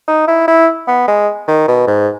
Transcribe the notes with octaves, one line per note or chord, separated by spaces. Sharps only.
D#4
E4
E4
B3
G#3
D#3
B2
G#2